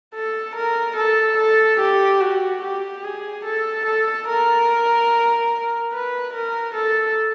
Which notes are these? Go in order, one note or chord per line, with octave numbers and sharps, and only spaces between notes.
A4
A#4
A4
A4
G4
F#4
G4
G#4
A4
A4
A#4
B4
A#4
A4